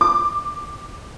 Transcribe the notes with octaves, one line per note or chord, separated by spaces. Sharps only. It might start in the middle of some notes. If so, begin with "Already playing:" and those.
D6